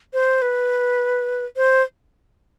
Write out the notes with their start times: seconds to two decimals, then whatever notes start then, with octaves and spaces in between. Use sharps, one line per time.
0.13 C5
0.42 B4
1.57 C5